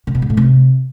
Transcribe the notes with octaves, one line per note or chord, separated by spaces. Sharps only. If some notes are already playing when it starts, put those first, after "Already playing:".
C3
B2
G#2
A2
C3